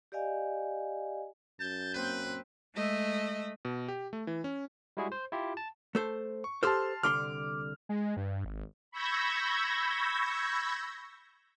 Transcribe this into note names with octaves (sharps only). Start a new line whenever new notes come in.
G4 D5 D#5 F5 G#5
F#2 A5 G6
A#3 C4 B4
G#3 A3 D#5 E5
B2
G4
A3
E3
C#4
G3 G#3 E4 F#4 G#4
C5
E4 F4 G4
A5
A3 A4 C5
C#6
G4 A4 C5 A5 C6 F6
C2 D3 C6 D6 F6
G#3
G2
G#1
B5 C#6 E6 G6 G#6 A#6